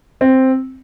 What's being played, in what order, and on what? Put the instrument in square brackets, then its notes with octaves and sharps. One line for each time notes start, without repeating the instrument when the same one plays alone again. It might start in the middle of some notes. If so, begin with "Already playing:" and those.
[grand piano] C4